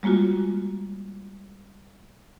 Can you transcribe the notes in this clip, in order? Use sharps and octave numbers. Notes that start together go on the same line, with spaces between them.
G3 G#3 A#3 F4 F#4